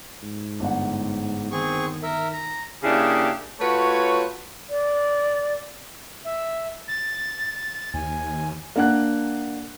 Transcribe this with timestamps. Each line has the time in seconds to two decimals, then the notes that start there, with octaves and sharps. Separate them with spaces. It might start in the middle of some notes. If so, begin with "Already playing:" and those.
0.22 G#2
0.60 G1 F#5
1.52 D#3 C4 G#4 C#6
2.03 A#4 E5
2.33 A#5
2.84 C#3 A#3 D4 E4 G4 G#4
3.60 A3 F4 F#4 B4 C#5
4.70 D5
6.25 E5
6.88 A6
7.94 D#2 G#5
8.76 A#3 D4 F#5 F#6